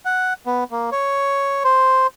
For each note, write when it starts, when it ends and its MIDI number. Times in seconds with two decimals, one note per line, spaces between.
0.05 0.33 78
0.46 0.64 59
0.71 0.90 58
0.92 1.63 73
1.64 2.07 72